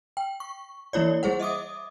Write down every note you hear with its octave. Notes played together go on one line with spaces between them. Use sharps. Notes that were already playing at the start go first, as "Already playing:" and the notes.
G5
C#6
E3 A#3 E4 C#5 D5
G3 G#4 C5 F#5
D#5 E5 D6 D#6